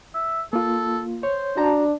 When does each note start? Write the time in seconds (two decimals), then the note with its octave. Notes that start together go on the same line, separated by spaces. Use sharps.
0.15 E5
0.53 A#3 F4 A4
1.23 C5 C#5
1.57 D4 F#4 A5 A#5